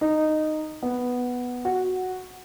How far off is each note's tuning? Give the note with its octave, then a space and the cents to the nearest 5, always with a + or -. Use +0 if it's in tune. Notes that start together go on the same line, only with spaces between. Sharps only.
D#4 -10
B3 +0
F#4 +0